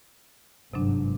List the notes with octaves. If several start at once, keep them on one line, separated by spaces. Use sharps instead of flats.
G1 G#2 C3 F#3 D4